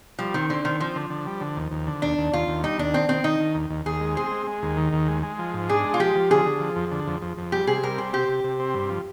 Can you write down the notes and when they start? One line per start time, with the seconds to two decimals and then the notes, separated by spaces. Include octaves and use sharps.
0.19 F3 G3
0.34 D#3 C4
0.50 D3 C4
0.65 D#3 C4
0.80 F3 C4
0.96 D3
1.10 D3
1.26 G3
1.41 D3
1.56 D#2
1.72 D#2
1.87 D3
2.02 D#2 D4
2.18 D#2
2.33 D#2 F4
2.48 D#2
2.63 G3 D#4
2.78 D#2 D4
2.94 D#3 C4
3.09 D#3 C4
3.24 D#3 D#4
3.40 D#3
3.55 D#2
3.70 D#2
3.86 D#2 G#4
4.01 G#3
4.16 C4 G#4
4.31 G#3
4.47 G#3
4.63 D#2
4.77 D#3
4.93 D#2
5.08 G#3
5.23 G#3
5.39 F3
5.54 G#2
5.69 D4 G#4
5.85 G#3
5.94 F4
6.00 F3 G4
6.15 F3
6.30 D3 G#4
6.46 D3
6.60 F3
6.76 F2
6.91 D3
7.07 F2
7.22 F2
7.38 F2
7.52 G3 G4
7.67 C3 G#4
7.83 G3 A#4
7.98 C4 G#4
8.13 C3 G4
8.28 C3
8.44 C3
8.59 C4
8.75 G2
8.90 F3